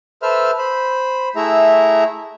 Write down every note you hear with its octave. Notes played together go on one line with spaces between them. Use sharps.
A4 B4 C5 E5 E6 F6
C5 B5
A3 E4 G#4 E5 A#5